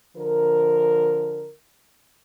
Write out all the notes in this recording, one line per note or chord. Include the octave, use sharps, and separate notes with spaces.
D3 F3 A#4